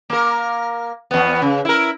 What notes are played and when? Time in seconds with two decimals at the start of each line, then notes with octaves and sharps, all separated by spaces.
0.10 A#3 A#4
1.11 E2 B3
1.42 C#3
1.65 E4 A#4